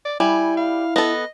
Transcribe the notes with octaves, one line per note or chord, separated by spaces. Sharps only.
D5
G3 E4 G#5
F5
B3 A4 D#5